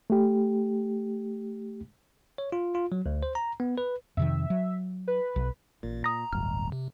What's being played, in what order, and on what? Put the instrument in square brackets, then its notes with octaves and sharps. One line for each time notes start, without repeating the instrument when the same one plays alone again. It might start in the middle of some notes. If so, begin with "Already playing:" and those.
[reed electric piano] A3 G4
[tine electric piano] C#5
F4
F4
F#3
D2
C5
A#5
B3
B4
[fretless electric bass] F2 C3 D#3 [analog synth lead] E5
[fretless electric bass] F#3
[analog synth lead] B4
[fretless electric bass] B1
[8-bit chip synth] A1 [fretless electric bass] A#2
[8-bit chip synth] A#5 [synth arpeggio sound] D#6 A#6
[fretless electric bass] D1 G1 [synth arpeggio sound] F6
[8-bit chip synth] C3